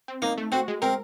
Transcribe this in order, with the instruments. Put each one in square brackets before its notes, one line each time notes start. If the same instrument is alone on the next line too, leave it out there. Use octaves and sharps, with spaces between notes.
[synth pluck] C4
[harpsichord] A#3 [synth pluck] D#4
[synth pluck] A3
[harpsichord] C4 [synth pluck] F#4
[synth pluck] G#3
[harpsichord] C4 [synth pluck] A#4